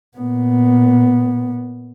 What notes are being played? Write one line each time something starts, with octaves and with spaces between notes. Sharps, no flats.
A#2 B3